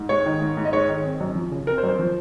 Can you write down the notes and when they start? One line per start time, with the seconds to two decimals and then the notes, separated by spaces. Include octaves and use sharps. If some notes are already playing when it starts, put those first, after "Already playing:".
Already playing: G#2
0.09 G#3 C#5
0.26 D#3
0.41 G#2
0.57 G#2
0.65 D#5
0.73 G#3 C#5
0.89 D#3
1.04 C4
1.20 F#2
1.35 F3
1.51 C#3
1.67 C4 A#4
1.78 C5
1.83 F#2
1.88 C5
1.99 F3